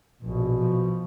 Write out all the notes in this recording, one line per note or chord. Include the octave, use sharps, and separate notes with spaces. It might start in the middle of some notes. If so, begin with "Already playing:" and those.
A#1 B2
F3